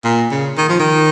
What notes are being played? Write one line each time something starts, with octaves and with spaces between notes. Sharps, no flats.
A#2
C#3
D#3
F3
D#3